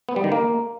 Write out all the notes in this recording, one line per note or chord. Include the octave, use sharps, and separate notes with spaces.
B3
G3
D#3
A#3